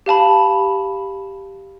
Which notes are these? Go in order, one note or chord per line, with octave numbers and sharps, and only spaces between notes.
G4 F5 A5 B5